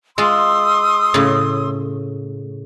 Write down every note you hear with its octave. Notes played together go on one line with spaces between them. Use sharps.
G#3 F4 C6 D#6 E6
A2 C#3